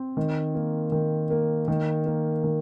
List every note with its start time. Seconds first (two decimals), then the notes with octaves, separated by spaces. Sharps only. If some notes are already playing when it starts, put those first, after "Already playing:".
Already playing: C4
0.17 D#3
0.54 A#3
0.92 D#3
1.30 A#3
1.68 D#3
2.06 A#3
2.44 D#3